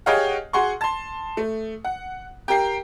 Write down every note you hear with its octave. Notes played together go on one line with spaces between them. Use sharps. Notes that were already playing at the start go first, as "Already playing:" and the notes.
G4 G#4 C#5 D#5 F5 F#5
F#4 G#4 F#5 C6 C#6
A5 C6
A3
F#5
G4 A#4 G5 C7